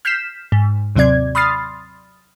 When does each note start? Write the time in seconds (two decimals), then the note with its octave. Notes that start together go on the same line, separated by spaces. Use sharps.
0.05 F6 G6 B6 C7 E7
0.52 G#2
0.96 D#2 C3 F#3 C4 D5 G#6
1.35 B5 C6 D#6 F6 A6 C7